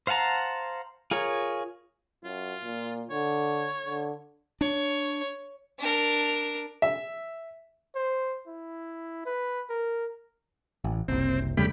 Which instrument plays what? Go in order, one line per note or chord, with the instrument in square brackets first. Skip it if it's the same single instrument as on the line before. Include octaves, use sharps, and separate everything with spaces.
[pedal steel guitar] C5 F5 F#5 A5 A#5
F4 G#4 A#4 C#5
[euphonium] F#2 [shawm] F4
[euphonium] A#2
[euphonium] D3 [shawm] C#5
[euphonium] D3
[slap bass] D4 [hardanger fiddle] C#5
[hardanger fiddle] D4 A#4
[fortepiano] E5
[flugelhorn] C5
E4
B4
A#4
[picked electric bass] A1
[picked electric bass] F#1 C2 [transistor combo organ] C4
[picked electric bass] E2 G3 A3 [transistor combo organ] C#3 G4 B5